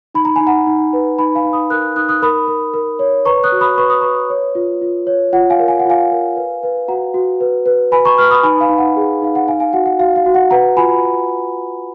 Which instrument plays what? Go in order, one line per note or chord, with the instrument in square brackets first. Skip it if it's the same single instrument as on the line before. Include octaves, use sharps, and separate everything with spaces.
[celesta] D#4 B5
A#5
D#4 G#5
F#5 A#5
D#4
B4
D#4 G#5 B5
F5 G#5
D#4
B5 D#6
A#4 D#6 F#6
D#4 D#6 F#6
D#6 F#6
A#4 B5 D#6
A#4
A#4
C#5
B4 A#5 C#6
D#6 F#6
F#4
B5 D#6
B4 C#6
D#6
B4 A#5 C#6
C#5
F4
F4
C#5
F4 F#5
F5 G#5
A#4
G#5
F#5
F4 F5 G#5
A#4
B4
B4
F#4 F#5 A#5
F#4
B4
B4
B4 G#5 B5
A#5 C#6
B4 C#6 F6
B5 D#6
D#4 G#5 B5
F5 G#5
D#4
F#5
G#4
D#4 F5
F#5
D#4 F5 G#5
F5 G#5
F#4 F#5
F#5
F#4 F5
F5
F#4
F#5
B4 F#5 A#5
F4 G#5 B5